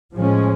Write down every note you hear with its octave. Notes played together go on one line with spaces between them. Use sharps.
A2 F3 G#3 C#4